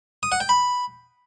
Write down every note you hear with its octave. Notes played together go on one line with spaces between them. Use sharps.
D#6
F#5
G5
B5